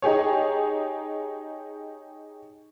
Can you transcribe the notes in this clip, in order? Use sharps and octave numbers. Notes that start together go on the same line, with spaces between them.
D#4 G4 G#4 C#5